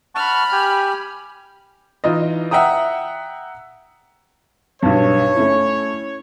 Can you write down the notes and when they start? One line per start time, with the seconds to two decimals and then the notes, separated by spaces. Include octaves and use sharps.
0.15 F#5 A5 B5 C#6 F6
0.52 G4 G5 G#5
2.04 E3 D#4 F4 D#5
2.51 E5 F#5 G5 A#5 D#6
4.83 B1 G2 C#5
5.35 A3 C#4 E4